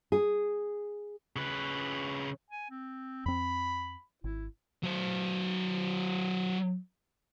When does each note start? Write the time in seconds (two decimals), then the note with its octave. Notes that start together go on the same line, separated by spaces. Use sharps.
0.12 G#4
1.36 C#3 B4
2.51 G#5
2.71 C4
3.26 F2 C4 B5
4.24 G#1 E4
4.83 F#3 C5